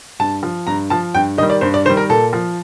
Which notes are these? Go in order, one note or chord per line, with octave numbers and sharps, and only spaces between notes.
G2 A5
F3
G2 A#5
F3 A5
G2 G5
D#3 G3 D#5
D5
G2 C5
D5
D#3 G3 C5
A#4
A#2 A4
F3